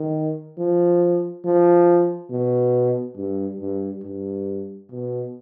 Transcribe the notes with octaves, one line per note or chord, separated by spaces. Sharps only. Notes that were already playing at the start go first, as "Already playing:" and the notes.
Already playing: D#3
F3
F3
B2
G2
G2
G2
B2